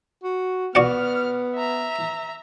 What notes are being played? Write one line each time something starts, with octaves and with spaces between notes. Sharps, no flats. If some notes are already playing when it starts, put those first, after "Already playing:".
F#4
B3 F#4 D5 F#5 F6
E5 A#5